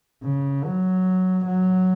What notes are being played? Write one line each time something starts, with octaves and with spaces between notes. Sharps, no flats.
C#3
F#3
F#3